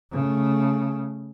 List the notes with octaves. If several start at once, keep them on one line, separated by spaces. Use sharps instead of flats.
C#3 A3